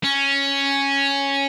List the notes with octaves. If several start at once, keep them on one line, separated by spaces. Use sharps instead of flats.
C#4